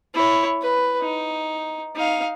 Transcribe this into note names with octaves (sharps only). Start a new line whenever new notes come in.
E4 C#5
B4
D#4
D#4 F5